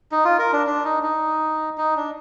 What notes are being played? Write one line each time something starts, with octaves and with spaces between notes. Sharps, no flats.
D#4
F4
A#4
D4
D4
D#4
D#4
D#4
D4